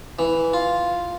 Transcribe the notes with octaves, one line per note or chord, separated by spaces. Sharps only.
E3
F4